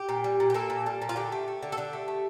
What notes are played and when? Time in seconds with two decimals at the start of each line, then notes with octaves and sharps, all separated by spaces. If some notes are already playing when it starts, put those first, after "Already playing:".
Already playing: G4
0.09 A#2
0.24 G3
0.40 A#2
0.50 G4
0.54 A#3 A4
0.70 A#2
0.86 G3 A4
1.02 A#2
1.09 F4
1.16 D3 G4
1.32 A3
1.48 A3
1.63 D3
1.72 A4
1.77 D3 G4
1.93 A3
2.08 A3